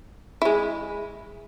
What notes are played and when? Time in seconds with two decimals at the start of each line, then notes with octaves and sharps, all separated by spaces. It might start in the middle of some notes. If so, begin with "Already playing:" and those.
0.42 G#3 E4